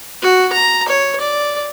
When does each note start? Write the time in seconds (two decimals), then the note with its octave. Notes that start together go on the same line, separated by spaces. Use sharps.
0.23 F#4
0.53 A#5
0.89 C#5
1.21 D5